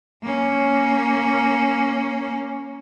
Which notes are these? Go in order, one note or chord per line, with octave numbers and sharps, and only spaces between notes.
A#3 C#4